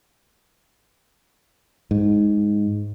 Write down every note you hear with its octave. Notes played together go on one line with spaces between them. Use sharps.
G#2